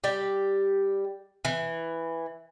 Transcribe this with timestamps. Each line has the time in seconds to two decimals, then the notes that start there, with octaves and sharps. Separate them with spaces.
0.04 G3 G4
1.45 E3